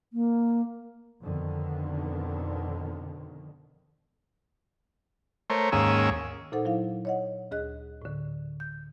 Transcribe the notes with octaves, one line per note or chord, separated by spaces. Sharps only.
A#3
F2 B2 D3 D#3
A3 A#4 C5 C#5
D#2 G#2 A#3 C#4 G#4 E6
A#2 D#4 A4 C5 F#5
F#3 E4 F5
C#5 D#5 F#5
D2 G#4 D#5 F#6
A2 D3
G6